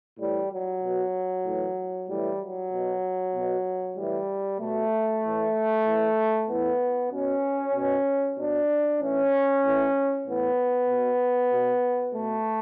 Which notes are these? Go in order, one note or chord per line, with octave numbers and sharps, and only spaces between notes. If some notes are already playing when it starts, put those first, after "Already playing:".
A2 E3 G3
F#3
B2
A2 E3
A2 E3 G3
F#3
B2
B2
A2 E3 G3
B2 A3
A2 E3
A2 E3
A2 E3 B3
B2 C#4
B2
B2 D4
A2 E3 C#4
A2 E3
A2 E3 B3
B2
B2
B2 A3